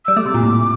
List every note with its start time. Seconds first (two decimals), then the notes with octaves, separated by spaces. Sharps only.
0.05 G3 E6
0.17 A3 D6
0.26 C3
0.34 A#2
0.43 A2